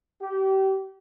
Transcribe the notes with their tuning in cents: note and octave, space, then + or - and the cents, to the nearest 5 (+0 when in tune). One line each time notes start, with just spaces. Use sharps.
G4 -30